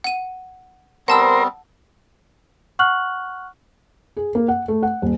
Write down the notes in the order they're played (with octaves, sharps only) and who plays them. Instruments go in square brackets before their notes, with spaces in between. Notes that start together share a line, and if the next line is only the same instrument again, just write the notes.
[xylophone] F#5 D#7
[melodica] G3 B3 C4 [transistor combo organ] A#4 C5 [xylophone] F#5 A5 E6
[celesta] F#5 C#6 F6 F#6 F#7
[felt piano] G#4
A#3
F#5
A3
F#5
D#1